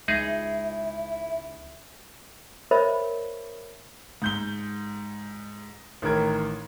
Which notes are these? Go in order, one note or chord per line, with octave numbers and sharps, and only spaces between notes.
C#2 G#3 D#4 E4 G#4 E5
A#4 C5 C#5 D#5 E5 B5
G#2 G6 G7
A1 D#3 E3 A#4 G#6